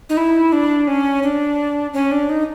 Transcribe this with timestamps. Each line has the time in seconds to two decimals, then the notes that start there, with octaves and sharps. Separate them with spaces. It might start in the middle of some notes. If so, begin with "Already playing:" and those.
0.09 D#4
0.17 E4
0.52 D4
0.88 C#4
1.23 D4
1.93 C#4
2.11 D4
2.29 D#4